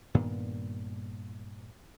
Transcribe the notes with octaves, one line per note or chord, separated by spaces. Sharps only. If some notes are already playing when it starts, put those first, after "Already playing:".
G2 A#2 D#3 B3